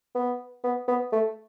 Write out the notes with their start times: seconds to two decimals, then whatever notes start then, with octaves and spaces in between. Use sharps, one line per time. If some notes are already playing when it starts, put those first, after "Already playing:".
0.15 B3
0.64 B3
0.88 B3
1.12 A3